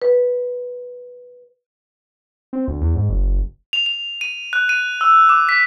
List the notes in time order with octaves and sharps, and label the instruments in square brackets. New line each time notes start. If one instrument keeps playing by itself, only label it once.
[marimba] B4
[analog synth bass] C4
D2
E2
G#2
F#1
[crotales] F7
F7
D#7
F#6
D#7
E6
D6
B6